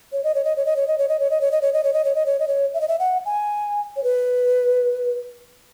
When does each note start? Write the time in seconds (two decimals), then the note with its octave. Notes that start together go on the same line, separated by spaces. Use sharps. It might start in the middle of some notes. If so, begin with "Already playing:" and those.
0.12 C#5
0.24 D#5
0.35 C#5
0.45 D#5
0.56 C#5
0.66 D#5
0.76 C#5
0.88 D#5
0.98 C#5
1.09 D#5
1.20 C#5
1.31 D#5
1.41 C#5
1.52 D#5
1.62 C#5
1.73 D#5
1.84 C#5
1.93 D#5
2.05 C#5
2.15 D#5
2.26 C#5
2.40 D#5
2.48 C#5
2.74 E5
2.81 D#5
2.88 E5
2.99 F#5
3.26 G#5
3.96 C#5
4.04 B4